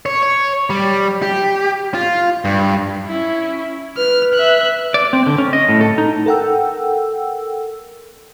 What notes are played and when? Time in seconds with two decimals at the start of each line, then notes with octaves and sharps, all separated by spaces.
0.06 C#5
0.23 C#5
0.70 G3
1.22 G4
1.94 F4
2.45 G2
3.07 C#4 E4
3.97 B4 F6
4.34 E5 F#6
4.94 D5
5.13 C4
5.26 D3
5.38 C#4
5.53 D#5
5.69 A2
5.81 A4
5.98 D#4
6.26 A4 A#4 F#5 G5 E6